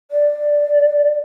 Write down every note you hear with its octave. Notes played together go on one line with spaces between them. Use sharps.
D5